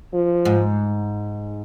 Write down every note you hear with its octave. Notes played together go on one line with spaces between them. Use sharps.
F3
G#2